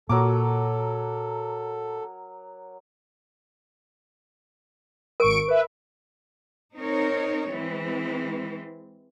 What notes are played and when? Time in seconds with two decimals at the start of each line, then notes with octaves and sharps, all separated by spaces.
0.09 A#2 F#3 A4 A#4 D6
5.20 G#1 A#4 C#6 D7
5.48 B4 E5
6.76 C4 D#4 A#4 C#5
7.51 E3 G#3 C4